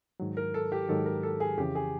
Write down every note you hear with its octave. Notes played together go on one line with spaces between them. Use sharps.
G#2 D#3 F#3
A#4
A4
G4
G#2 D#3 F#3 A4
A#4
A4
G#4
F2 C#3 E3 G4
G#4